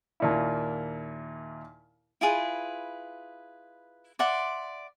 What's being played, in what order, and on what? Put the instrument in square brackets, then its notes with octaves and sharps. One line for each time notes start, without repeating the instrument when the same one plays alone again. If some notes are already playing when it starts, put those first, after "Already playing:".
[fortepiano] D#2 A#2 E4
[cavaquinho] E4 F4 G#4 B4
D5 E5 F#5 C6